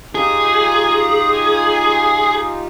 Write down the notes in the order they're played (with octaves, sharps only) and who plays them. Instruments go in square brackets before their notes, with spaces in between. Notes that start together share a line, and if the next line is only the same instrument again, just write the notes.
[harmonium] D#4 F4 G4 [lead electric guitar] G#4 [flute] D#6